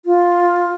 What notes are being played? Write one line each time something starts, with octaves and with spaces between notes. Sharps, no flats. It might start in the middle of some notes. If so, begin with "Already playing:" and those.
F4